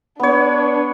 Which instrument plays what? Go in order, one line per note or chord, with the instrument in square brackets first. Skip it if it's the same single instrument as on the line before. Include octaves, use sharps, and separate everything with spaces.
[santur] B3 C#5 [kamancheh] D4 B4